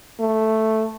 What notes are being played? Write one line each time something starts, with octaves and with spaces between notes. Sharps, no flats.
A3